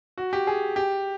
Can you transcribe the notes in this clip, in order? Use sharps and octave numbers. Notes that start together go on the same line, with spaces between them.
F#4
G4
G#4
G4